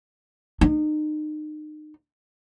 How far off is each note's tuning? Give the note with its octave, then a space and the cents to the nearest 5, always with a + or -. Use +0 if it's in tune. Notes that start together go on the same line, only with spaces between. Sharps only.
D#4 -35